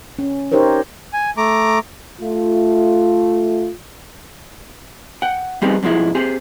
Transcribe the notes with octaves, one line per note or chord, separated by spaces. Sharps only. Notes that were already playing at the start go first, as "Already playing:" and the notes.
C#4
D#4 G4 A#4 C5 C#5
G#5
A3 A#5 D6
A3 F4
F#5 G5
G3 B3 C4 D#4 G4 G#4
F2 G#2 B2 F3 G#3 E4
C4 G4 G#4